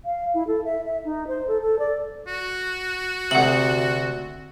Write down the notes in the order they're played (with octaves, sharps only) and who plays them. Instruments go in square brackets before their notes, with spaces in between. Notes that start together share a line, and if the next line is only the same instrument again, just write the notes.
[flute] F5
E4
A4
E5
E5
D#4
C5
A4
A4
D5
[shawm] F#4
[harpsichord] D2 C3 [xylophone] F#5 F#7